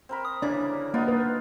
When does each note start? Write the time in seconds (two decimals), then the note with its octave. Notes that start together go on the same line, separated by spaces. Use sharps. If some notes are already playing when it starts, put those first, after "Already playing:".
0.09 C4 A#4 B5
0.25 D#6
0.42 C#3 E3 A#3 D4 D5
0.94 A#3 B3 D#4 F4
1.08 B4